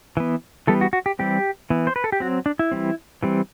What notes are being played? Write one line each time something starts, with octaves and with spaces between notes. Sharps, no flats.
E3 B3
E3 G3 B3 A4
F#4
F#4
G4
E3 G3 C4 G4
E3 B3
C5
B4
A4
G4
F#3 C4 F#4
D4
E4
E3 G3 C4
E3 G3 C4